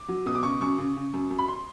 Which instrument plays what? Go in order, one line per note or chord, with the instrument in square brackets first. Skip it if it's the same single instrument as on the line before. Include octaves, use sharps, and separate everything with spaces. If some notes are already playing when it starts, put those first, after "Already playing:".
Already playing: [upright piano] D6
F#3
B2 D#6
D6
C#3 C#6
F#2 C#6
C#3
C#3
F#2
F#2
B5
C6